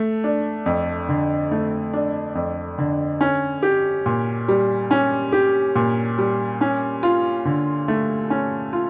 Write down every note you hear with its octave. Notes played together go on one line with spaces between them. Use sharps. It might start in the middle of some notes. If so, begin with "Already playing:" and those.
Already playing: A3
D4
F2
D3
A3
D4
F2
D3
C#4
G4
A#2
G3
C#4
G4
A#2
G3
C#4
F4
D3
A3
C#4
F4